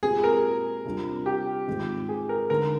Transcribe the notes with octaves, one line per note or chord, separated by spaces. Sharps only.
A#2 G#3 C4 G4 G#4
A#4
C3 G3 D4 F4
G4
G#2 D#3 G#3 C4 F4
G#4
A#4
D3 G#3 D#4 A#4